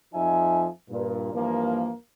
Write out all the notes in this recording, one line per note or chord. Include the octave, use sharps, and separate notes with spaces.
F2 F3 D#4 E5 G#5
G2 A#2
G2 E3 F3 A#3